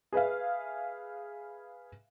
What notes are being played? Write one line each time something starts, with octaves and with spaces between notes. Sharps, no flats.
G#4 B4 E5 F5